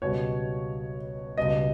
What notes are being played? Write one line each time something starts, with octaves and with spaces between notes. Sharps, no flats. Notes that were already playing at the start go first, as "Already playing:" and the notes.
C#2 B2 G3 C#5
C#2 B2 G3 D#5